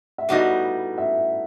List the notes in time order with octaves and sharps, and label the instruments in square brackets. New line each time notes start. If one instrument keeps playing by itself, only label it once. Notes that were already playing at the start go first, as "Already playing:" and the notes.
[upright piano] E5
[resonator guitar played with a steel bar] A2 G3 B3 D#4 F#4 [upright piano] F#5
[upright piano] E5